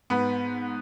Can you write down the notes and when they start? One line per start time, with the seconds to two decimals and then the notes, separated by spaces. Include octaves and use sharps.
0.10 G#2 B3 B4